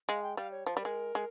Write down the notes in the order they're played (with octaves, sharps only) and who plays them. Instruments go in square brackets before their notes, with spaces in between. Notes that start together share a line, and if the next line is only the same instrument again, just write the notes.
[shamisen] G#3 [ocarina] F5
[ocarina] G5
[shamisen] G3 [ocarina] F5
[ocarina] C#5
[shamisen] F3 [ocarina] C5
[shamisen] G3
[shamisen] G#3 [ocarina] A#4
[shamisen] G#3